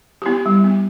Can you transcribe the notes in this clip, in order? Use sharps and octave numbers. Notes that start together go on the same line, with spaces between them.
G4
B3 E4
G3
B3